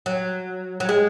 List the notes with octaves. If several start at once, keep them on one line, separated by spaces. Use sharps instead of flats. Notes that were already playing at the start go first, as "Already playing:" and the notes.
F#3
F#3
G#3